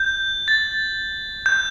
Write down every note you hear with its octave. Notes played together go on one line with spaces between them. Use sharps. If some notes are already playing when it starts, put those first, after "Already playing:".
Already playing: G6
A6
G6